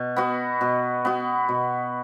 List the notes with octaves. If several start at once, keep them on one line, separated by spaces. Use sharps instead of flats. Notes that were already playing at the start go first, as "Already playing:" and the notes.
Already playing: B2
B3 F#4
B2
B3 F#4
B2